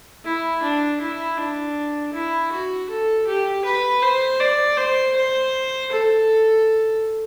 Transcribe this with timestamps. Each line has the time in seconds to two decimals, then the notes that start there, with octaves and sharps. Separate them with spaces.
0.24 E4
0.62 D4
1.00 E4
1.37 D4
2.13 E4
2.51 F#4
2.89 A4
3.27 G4
3.65 B4
4.02 C5
4.40 D5
4.77 C5
5.15 C5
5.91 A4